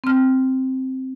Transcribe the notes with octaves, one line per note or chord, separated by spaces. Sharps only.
C4 F6